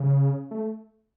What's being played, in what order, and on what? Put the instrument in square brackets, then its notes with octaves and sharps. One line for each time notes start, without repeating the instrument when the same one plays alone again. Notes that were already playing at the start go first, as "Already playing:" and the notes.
Already playing: [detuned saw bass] C#3
A3